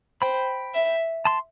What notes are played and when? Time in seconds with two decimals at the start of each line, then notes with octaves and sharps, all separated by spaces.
0.21 C5 G5 B5
0.74 E5
1.25 A5 C6